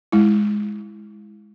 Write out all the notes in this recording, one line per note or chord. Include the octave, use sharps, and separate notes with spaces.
G#3 E4